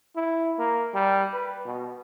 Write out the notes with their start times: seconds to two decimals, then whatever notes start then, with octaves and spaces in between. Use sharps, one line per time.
0.16 E4
0.59 A#3
0.94 G3
1.33 B4
1.65 B2